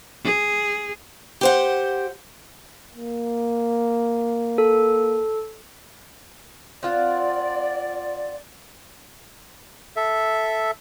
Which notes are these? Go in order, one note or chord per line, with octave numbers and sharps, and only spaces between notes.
G#4
G4 C5 F#5
A#3
A4
C4 F4 D5 F#5
A4 E5